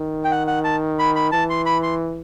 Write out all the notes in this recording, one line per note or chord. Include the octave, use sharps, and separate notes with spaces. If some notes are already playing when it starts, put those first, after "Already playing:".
Already playing: D#3
G5
F#5
F#5
A5
B5
B5
E3 A5
C6
B5
C6